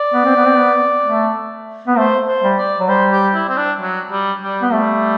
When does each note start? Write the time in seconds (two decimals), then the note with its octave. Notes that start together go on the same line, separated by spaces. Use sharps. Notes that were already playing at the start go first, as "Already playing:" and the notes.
Already playing: D5
0.14 B3
0.25 C4
0.36 B3
0.47 C4
0.58 B3
1.06 A3
1.88 B3
1.97 A3 C5
2.28 C5
2.43 G3
2.58 D5
2.80 F#3
2.89 G3 C5
3.12 G4
3.34 E4
3.49 C4
3.57 D4
3.80 F#3
4.11 G3
4.42 G3
4.62 B3
4.72 G3 A3